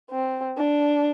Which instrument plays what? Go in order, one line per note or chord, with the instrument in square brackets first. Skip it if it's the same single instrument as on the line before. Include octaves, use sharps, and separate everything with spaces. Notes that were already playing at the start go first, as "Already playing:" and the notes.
[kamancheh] C4
D4